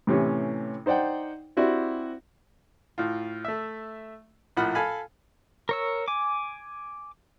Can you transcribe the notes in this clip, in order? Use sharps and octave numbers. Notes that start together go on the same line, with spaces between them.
A2 C3 E3 C#4
D#4 C5 D5 F#5 G5
C4 E4 F#4 G4 D5
A2 F4
A3 E5
A#1 A2 F3 F#5 B5 F6
A4 F5 G#5 B5
A#4 C#5 E6
G#5 D6